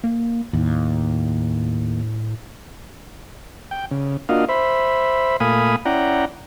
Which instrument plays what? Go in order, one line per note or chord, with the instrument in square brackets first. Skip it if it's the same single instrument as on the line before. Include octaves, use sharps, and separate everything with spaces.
[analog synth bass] A#3
[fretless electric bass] D#2 [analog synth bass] A2
[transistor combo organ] G5
C#3
A#3 D4 F4 F#4 D#5 F5
C5 E5 B5
A#2 A3 F5 G#5 B5 D#6
C#4 E4 D5 F#5 G5 A#5